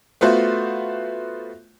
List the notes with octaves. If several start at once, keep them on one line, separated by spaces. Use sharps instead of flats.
A3 B3 F4 F#4 C5